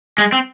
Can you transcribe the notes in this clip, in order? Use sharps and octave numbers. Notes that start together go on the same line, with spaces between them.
G#3
C4